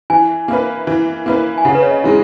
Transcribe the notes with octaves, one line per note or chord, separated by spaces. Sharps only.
E3 G#5
A#3 E4 B4
E3
A#3 E4 B4
G#5
C#3 F#5
B4
C#5
D#5
E3 G#3 D#4